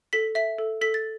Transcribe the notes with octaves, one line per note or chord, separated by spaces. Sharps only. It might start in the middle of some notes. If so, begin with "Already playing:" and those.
A4 B6
E5 B6
A4
A4 B6
A6